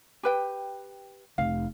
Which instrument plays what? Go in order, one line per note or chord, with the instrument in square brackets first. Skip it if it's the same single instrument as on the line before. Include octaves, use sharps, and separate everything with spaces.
[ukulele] G4 B4 G5
[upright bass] F1 [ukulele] F5